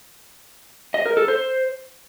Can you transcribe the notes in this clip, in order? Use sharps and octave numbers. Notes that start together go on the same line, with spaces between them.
D#5
A#4
A4
C5